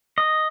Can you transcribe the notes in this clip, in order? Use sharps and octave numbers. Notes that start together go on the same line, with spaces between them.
D#5